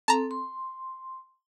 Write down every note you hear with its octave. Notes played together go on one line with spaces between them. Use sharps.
C4 A4 A5 A#5
C6